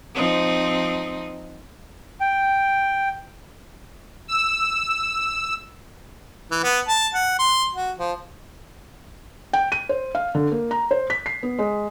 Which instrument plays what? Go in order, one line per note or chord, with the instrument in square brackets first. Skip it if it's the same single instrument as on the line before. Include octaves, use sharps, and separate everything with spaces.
[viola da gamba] F3 C4 D#4
[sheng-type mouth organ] G5
[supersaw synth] E6
[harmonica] E3
B3
A5
F#5
C6
F#4
F3
[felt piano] G5
D#7
C5
F5
D3
A#3
A#5
C5
B6
C7
B3
G#3